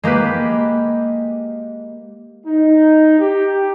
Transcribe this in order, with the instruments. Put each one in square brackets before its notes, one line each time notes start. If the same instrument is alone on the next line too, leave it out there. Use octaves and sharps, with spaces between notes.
[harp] G#3 A#3 G4 B4
[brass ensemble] D#4
G4